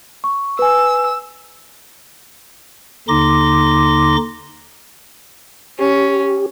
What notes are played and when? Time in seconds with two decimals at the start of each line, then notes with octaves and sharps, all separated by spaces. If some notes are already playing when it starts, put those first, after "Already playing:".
0.24 C#6
0.59 B4 G#5 E6
3.08 D#2 D3 D#4 C6 D6 A#6
5.79 C#4 G4